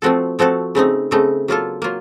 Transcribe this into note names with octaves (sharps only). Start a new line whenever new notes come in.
F3 A3 C4 F#4 A4
F3 A3 C4 F#4 A4
C#3 A3 C4 D#4
C#3 A3 C4 D#4
F#3 A#3 F4 A4
F#3 A#3 F4